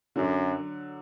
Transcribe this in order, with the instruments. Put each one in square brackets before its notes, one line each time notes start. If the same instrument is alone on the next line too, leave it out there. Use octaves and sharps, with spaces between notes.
[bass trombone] F#2 [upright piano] D3 F#3